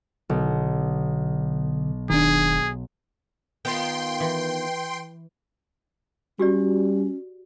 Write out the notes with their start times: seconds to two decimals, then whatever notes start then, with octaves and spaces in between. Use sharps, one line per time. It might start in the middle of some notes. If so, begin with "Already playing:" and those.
0.30 B1 D3
2.10 E1 D#3 D4 G#4
3.65 D#3 B3 F4 G5 C6
4.20 E3
6.39 G3 C#4 F#4 G4 D5